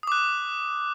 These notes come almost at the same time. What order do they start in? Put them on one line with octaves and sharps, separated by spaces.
D#6 D6 F#6